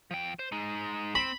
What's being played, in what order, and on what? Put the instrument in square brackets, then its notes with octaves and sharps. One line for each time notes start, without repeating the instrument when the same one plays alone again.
[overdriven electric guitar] F3 G5
C5
G#3 D#4
[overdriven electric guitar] C4 [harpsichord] B5